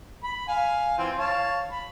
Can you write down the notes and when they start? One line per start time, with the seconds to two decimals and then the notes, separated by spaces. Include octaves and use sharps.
0.23 B5
0.48 F5 G#5
0.98 E3 C4 F4
1.18 C#5 F5 A5
1.72 B5